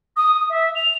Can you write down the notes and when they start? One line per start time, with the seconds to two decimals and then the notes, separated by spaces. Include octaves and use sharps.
0.16 D#6
0.34 D#6
0.49 E5
0.75 F7